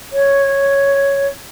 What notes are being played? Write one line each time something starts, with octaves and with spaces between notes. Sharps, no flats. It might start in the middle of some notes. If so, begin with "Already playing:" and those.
C#5